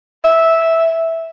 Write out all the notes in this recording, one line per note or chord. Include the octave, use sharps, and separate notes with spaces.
E5